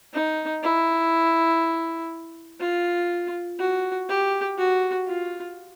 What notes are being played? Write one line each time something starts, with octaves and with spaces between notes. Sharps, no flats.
D#4
E4
F4
F#4
G4
F#4
F4